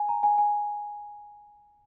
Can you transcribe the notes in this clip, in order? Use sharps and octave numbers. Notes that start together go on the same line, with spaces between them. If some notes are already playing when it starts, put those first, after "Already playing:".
Already playing: G#5
A#5
G#5
G#5